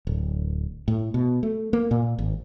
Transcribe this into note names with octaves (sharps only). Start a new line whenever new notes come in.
D1
A2
B2
A3
A#3
A#2
G#1